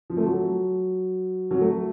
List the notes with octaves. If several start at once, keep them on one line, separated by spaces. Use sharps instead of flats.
F3
A3
F#3
F#3
A3